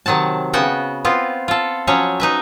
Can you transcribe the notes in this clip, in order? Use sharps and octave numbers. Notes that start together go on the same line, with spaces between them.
C3 D#3 F#3 F#5 A5
C#3 B3 F#4 F#5 G5
B3 C4 F4
F4 A4
F3 F#3 C#4 C#5
D#4 B4 E5